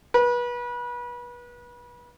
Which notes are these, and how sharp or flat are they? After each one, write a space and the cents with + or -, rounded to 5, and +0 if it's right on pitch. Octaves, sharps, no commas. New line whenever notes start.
B4 -30